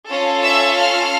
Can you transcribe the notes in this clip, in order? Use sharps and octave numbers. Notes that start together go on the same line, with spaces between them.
C#4 F4 A4
E5 E6
F5 F6